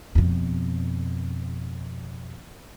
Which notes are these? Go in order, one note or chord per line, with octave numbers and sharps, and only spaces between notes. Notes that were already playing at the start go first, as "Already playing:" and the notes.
F2 B2